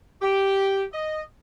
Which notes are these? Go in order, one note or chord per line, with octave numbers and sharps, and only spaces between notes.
G4
D#5